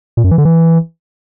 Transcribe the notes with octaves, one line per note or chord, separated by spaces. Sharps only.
A#2
F#2
E3
D3
E3